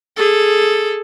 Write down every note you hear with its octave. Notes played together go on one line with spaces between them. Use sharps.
G#4 A4